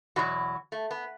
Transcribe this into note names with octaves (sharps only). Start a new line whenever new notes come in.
E2 B2 F#3 F#4
A3
B3